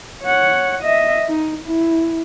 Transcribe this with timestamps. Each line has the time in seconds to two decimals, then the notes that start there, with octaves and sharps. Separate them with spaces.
0.24 C#5 F#5
0.83 D#5 E5
1.28 D#4
1.64 E4